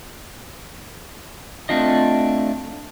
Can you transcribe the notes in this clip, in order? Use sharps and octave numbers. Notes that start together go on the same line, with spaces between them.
A3 C4 D4 F4 D#5